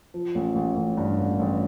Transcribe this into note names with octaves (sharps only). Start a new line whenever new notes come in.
F3
A1
A1
A1
G2
A1
A1